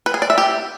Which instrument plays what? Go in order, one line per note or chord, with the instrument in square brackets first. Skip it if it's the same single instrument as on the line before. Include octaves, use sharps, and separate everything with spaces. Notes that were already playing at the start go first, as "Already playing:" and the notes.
[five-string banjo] B4
G#4
D5
E5
G4